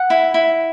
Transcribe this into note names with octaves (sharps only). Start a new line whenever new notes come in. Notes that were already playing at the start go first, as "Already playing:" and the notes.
Already playing: F#5
E4
E4